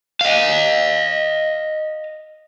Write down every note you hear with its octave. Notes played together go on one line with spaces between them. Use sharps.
D#5 F5